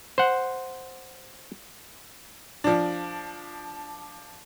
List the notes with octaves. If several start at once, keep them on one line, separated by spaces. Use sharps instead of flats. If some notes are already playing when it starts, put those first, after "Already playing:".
C5 F#5
F3 D4